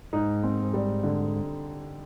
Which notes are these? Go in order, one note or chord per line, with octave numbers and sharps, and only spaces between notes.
G#2 D#4
C4
G3
D3